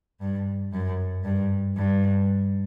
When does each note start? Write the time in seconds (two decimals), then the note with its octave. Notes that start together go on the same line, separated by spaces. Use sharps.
0.21 G2
0.73 F#2
1.24 G2
1.76 G2